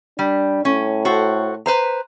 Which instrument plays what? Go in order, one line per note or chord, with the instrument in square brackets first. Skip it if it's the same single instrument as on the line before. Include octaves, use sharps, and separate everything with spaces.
[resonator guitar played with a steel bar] G3 [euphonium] D4
[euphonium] A2 [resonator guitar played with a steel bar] C#4
[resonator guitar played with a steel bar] F#4 A4 C5
B4 C5 A#5